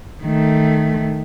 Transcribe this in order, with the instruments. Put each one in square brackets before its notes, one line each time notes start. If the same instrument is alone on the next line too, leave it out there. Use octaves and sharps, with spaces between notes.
[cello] D#3 A3